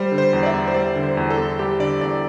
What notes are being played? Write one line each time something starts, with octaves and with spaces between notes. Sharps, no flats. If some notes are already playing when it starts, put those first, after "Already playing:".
Already playing: G3 C5
D3
C5
E2
D5
E5
E2
C5
G3 D5
D3
C5
E2
A4
E2
G3 G4
D3 D5
E2 D5